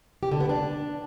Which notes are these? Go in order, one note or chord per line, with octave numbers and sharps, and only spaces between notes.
G4
D3
B3
D4